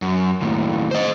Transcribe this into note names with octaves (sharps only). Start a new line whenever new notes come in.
F#2
D#2 A2
C5 D#5